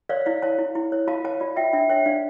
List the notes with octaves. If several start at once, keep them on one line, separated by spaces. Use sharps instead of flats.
C#5 D5 F5
E4 D5 F5
C#5 F5 A5
E4
E4
C#5
F4 F5 A5
C#5 F5 A5
F4 D5
F4 E5 G5
D4 E5 G5
C#5 E5 G5
D4 D5 F5